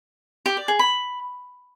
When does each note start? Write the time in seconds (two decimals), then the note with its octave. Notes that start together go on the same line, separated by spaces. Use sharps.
0.46 G4
0.57 D5
0.68 G#4
0.79 B5